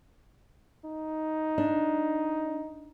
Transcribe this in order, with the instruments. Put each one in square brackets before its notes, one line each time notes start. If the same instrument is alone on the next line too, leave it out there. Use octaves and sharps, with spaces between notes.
[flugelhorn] D#4
[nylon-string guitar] D4